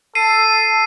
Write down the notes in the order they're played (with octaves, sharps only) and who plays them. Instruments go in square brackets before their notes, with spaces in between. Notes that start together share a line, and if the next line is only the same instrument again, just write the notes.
[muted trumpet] A4 [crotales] C7 D#7